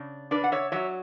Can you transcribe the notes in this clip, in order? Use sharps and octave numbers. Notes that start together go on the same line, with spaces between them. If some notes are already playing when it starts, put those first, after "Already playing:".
Already playing: C#3 D4
D4 B4 D5
F#5
C#5 E5
F#3 C#5 E5